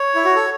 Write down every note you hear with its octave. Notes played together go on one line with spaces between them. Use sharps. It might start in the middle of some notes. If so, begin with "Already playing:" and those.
Already playing: C#5
E4
F#4
A4